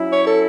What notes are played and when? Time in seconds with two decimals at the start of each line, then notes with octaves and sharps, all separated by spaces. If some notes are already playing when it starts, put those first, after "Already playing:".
Already playing: F#3 C#4 E4
0.12 C#5
0.27 A4